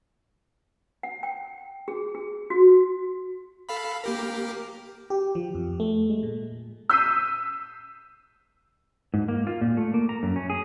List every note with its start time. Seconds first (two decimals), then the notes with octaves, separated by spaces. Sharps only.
1.03 F#5
1.23 G5
1.88 G#4
2.15 G#4
2.50 F#4
3.69 A4 F5 B5
4.04 A#3 G4 A#4
5.10 G4
5.35 F3
5.55 F2
5.80 A3
6.10 G#3
6.23 A#2
6.90 E6 G6 B6 C7 D#7
9.14 G#2
9.28 A#3
9.47 F4
9.61 A#2
9.77 A3
9.94 A#3
10.09 A#5
10.23 F#2
10.36 C#4
10.50 G#4